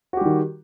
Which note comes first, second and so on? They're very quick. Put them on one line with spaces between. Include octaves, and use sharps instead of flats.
F#4 G4 G3 D#3